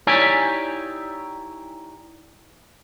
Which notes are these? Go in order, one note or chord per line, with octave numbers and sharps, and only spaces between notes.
D#4 E4 G4 C#5 D5 G#5